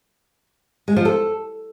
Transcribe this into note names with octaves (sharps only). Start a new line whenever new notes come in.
G#3
F3
A4